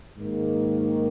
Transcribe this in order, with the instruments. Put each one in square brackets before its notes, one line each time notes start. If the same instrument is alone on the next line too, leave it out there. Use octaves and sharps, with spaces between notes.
[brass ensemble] G#2 D#3 A#3